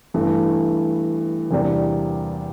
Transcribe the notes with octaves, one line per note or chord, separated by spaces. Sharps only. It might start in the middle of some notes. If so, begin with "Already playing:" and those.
G2 E3 A3
E2 C3 G3 A#3 D4